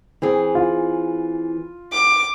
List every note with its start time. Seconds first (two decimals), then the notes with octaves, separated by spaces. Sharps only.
0.22 E3 C4 G#4
0.55 F4
1.92 D6